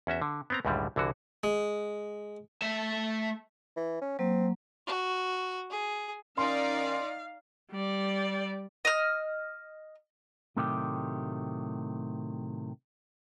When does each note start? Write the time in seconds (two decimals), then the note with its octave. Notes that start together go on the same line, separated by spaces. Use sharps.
0.07 E2 C#4 F#4 E5
0.22 D3
0.50 B3 C4 A#5
0.65 C#2 F#2 A2 D3 G3
0.96 C2 D3 E3 F#4
1.44 G#3
2.62 A3 E5
3.76 E3
4.01 C#4
4.19 F#3 A#3 C4
4.86 F#4
5.70 G#4
6.38 D#3 C#4 D#4 D5 F5 C6
7.71 G3 D5
8.85 D#5 F6
10.57 A2 C3 D#3 F#3 A3 G4